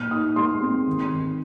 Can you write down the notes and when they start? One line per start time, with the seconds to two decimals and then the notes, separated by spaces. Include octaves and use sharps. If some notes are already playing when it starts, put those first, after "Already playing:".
Already playing: A#2 F6
0.11 D#4 D#6
0.36 G#3 C6
0.62 C4
0.87 D#3
1.12 D#3